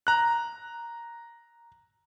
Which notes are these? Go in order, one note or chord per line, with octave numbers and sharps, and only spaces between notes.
A#5 F#6